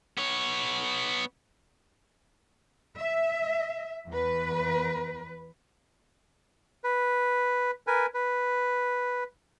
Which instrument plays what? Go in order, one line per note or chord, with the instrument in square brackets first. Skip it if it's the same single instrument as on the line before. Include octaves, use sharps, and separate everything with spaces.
[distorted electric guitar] B3 C#5
[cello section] E5
E2 B4
[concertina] B4
A#4 B4 G#5
B4